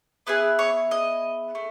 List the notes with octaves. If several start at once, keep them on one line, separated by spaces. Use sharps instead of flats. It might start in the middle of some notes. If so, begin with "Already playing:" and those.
B3 E4 G#4 B4
C#5
D#5
A3